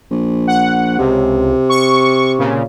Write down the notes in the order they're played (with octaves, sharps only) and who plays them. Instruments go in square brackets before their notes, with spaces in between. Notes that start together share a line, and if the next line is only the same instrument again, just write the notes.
[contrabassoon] A#1
[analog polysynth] F#5
[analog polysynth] C#2 [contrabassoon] C3
[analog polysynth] C#6
A#2 C#3